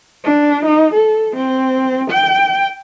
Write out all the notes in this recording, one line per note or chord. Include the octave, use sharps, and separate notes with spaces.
D4
D#4
A4
C4
G5